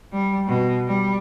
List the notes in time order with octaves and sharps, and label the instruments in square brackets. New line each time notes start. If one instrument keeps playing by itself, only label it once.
[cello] G3
B2
G3